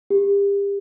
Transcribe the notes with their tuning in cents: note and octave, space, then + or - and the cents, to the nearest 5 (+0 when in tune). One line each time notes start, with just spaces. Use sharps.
G4 +35